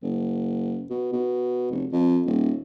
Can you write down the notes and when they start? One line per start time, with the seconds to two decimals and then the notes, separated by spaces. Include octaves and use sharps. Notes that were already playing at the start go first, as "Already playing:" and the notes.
0.02 F#1
0.90 B2
1.12 B2
1.71 F1
1.92 F2
2.25 D#1